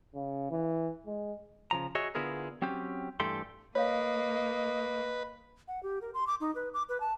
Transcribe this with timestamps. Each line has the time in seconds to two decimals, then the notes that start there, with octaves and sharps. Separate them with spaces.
0.15 C#3
0.51 E3
1.07 G#3
1.71 C#3 F3 A#5
1.95 F#4 G#4 C#5 D#5 E5
2.15 D3 B3 E4 F4 G#4 A#4
2.62 F#3 C4 C#4 G4
3.20 G2 E3 A3 G4 A4 C6
3.75 A#3 B4 C#5 D#5 F5
5.68 F#5
5.83 G4
6.01 A#4
6.14 C6
6.27 D6
6.40 D#4
6.55 B4
6.74 D6
6.89 B4
7.00 A5